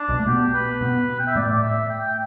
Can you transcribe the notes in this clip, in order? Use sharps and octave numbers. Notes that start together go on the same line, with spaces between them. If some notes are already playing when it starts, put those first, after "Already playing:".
Already playing: D4
B1 B2
A3
B2 B3 G4
B4
B2 B3
G5
E5
A2 A3 D5
D5
E5
G5
G5